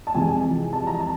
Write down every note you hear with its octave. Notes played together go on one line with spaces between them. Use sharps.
A5
F2 C3 E3 G#3 G#5
A5
A#5
A5